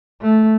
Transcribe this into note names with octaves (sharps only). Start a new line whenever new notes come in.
A3